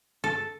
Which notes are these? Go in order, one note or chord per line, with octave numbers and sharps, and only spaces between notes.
A4